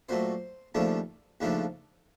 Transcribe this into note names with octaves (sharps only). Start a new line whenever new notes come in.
A#2 F#3 A3 C5
D#2 C#3 F3 A3 D4
D#2 C#3 F3 A3 D4